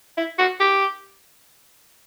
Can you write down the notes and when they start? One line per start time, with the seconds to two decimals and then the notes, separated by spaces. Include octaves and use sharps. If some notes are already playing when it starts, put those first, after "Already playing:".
0.17 E4
0.38 F#4
0.60 G4